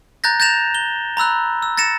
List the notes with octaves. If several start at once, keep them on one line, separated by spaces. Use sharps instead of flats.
A#5 F#6 G6 A6 A#6
G6 A6 A#6 E7 F7
G7
A#5 B5 E6 F#6
E6
A6 A#6 C#7 E7